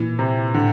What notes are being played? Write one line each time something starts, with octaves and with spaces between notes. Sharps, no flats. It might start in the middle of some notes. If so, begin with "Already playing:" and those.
Already playing: A#2 E3
C3
A2 D3